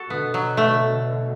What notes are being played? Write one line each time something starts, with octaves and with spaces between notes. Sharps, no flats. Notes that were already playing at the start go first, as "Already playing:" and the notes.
Already playing: F#4 A4
B2 D3 B3
F#3
A3